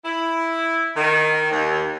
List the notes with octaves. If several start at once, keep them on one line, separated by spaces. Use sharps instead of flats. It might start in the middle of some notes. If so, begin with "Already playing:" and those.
E4
D#3
D#2